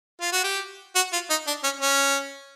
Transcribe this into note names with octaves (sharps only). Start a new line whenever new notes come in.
F4
F#4
G4
F#4
F4
D#4
D4
C#4
C#4